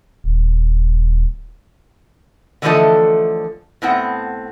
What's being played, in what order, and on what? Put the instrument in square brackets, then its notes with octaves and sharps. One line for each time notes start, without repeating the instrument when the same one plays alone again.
[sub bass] D#1
[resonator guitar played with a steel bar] D3 E3 F3 A3 A4 D#5
A2 B3 C4 F#5